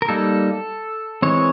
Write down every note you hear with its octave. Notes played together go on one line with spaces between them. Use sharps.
A#4
G3 A#3 D#4 A4
E3 G#3 C4 C#5